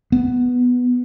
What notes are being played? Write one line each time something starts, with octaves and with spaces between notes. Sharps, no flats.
B3